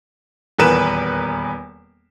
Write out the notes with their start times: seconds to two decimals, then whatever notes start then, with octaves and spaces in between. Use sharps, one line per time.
0.59 D#1 E2 B3 A#4 B4 E7